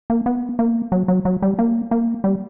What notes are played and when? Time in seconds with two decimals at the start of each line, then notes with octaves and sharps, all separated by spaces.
0.10 A#3
0.26 B3
0.59 A#3
0.92 F#3
1.08 F#3
1.25 F#3
1.42 G3
1.59 A#3
1.91 A#3
2.24 G3